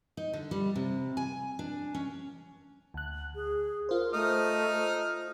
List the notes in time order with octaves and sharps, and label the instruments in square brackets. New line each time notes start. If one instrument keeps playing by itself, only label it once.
[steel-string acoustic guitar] D#4
D3
G3
C3
G#5
D4
C#4
[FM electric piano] D2 F#6
[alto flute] G#4
[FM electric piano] F4 C5 [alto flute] A#4
[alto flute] A3 [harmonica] D#4 D#6 F6